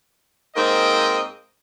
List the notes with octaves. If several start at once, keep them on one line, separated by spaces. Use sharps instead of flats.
G#2 A#3 C4 D#5 G5